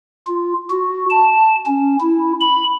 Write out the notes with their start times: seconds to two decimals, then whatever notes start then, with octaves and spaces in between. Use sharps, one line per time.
0.27 F4
0.70 F#4
1.10 A5
1.66 C#4
2.01 E4
2.41 B5